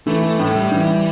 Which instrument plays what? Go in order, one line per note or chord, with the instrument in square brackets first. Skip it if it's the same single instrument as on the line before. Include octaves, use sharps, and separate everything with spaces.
[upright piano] E3 [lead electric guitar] A3
[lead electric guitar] A3
[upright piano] A2 [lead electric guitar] A3
[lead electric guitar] G3
[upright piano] E3